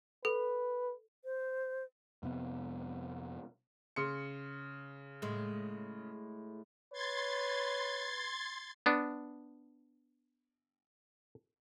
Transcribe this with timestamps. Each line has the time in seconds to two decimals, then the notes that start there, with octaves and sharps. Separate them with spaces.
0.25 A4 B4
1.25 C5
2.23 F2 C3 B3
3.96 C#3 C6 C#7
5.22 A2 G#3
6.93 B4 C#5 C6 G#6 A6
8.86 B3 D4